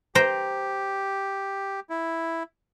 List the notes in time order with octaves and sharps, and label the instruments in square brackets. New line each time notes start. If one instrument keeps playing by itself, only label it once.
[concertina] G4 [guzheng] C5 G5 A#5
[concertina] E4